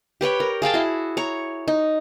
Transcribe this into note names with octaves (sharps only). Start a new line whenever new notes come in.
G4 B4 C#5 G5
A#4
G#4 F5 G5 A5
E4 F#4
C#5 A#5
D#4